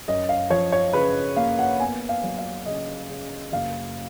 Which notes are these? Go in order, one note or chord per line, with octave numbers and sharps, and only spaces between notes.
F#2 D#5
F5
F3 C#5
C#5
C#3 B4
A#3 F5
F#5
B3 G#5
F5
F#3
F5
C#3 D#5
C#3
F#1 F5